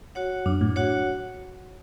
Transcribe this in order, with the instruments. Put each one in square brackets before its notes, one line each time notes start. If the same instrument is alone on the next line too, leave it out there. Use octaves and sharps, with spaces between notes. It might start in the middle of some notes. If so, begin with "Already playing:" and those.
[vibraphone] F#4 C#5 F#5
[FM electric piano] F#2 [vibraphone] D4
[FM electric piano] A2
[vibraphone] F#4 C#5 F#5